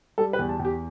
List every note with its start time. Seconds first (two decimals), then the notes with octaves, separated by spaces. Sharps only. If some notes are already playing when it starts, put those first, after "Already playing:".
0.18 G3 A4
0.33 B4
0.39 E2
0.49 A5
0.60 E2
0.65 G4